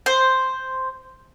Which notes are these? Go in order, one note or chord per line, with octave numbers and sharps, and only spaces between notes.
C5